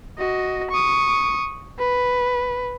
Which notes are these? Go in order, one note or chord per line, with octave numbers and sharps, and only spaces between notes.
F#4 D#5
C#6 D#6
B4